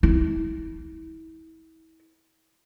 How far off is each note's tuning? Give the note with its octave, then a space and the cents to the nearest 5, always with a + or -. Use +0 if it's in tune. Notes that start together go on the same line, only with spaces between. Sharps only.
E4 -35